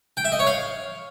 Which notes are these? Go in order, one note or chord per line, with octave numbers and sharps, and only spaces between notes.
G5
E5
D#5
C#5
F5